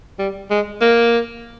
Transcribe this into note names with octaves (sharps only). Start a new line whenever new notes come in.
G3
G#3
A#3